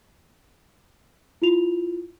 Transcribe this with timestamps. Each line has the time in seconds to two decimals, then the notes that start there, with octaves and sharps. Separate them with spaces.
1.42 E4 F4 F7